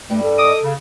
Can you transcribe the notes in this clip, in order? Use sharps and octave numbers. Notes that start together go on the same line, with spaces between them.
G2 G3 A3
A4
D#5 D6 D#6
C#3